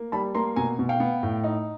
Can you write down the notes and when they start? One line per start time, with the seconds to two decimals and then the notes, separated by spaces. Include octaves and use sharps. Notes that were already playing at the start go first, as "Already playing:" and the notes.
Already playing: A#3
0.12 G3 A5 B5
0.35 A#3 A#5 C6
0.56 B2 G#5 A#5
0.79 B2
0.89 F5 G5
1.00 B3
1.23 A2
1.44 D#4